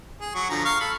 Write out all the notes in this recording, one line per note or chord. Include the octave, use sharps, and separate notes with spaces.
G#4
F#3 C#6
D3 F3 A#5
F5 C#6
A4 B5